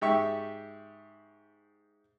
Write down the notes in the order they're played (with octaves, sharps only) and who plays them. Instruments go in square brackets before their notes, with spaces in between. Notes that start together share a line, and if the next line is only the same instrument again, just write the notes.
[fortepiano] G#2 G4 E5 C#6